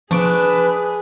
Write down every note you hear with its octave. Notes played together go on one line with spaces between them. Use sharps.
F3 D4 G#4 B4 C#6 D7